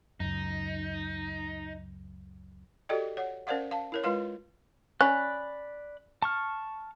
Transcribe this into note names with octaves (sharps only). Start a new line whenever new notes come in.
C#2 F#2 D#4
F#4 G4 A4 D5 D#5 G5
C#5 F#5
C#4 A#4 C5 D5 F5 F#5
F5 A5
E4 A#4 C#5
G#3 F4 B4 F5 C6
C#4 D5 B5 F#6
A5 C#6 F6